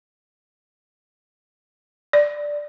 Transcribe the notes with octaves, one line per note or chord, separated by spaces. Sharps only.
D5